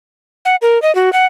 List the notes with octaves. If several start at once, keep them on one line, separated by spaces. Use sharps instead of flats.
F#5
A#4
D#5
F#4
F#5